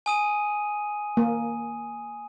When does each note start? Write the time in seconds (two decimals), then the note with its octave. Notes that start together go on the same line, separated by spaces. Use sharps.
0.06 G#5 D#6 D#7
1.17 A#3